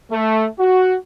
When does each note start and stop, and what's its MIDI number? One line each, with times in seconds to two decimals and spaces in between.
0.11 0.46 57
0.60 0.96 66